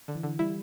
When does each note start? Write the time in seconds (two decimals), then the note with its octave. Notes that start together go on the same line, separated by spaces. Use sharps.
0.08 D3
0.15 E3
0.23 D3
0.39 G3 E4